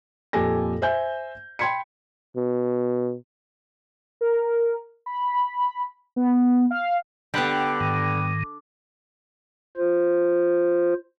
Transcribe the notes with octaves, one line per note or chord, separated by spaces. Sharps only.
F2 A#2 G4 A4 G#5 A#6
C5 E5 G#5 G6
G5 B5 C6 G#6 B6 C#7
B2
A#4
B5
B3
F5
D3 G3 B3 G5 B5 F#6
G#2 D#3
F4 C5